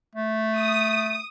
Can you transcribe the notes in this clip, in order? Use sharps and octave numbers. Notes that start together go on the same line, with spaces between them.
A3
D#6